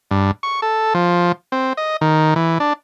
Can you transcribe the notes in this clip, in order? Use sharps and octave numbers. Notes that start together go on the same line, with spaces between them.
G2
C#6
A4
F3
C4
D#5
D#3
E3
D4